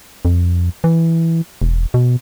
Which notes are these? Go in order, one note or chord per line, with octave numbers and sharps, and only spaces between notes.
F2
E3
E1
B2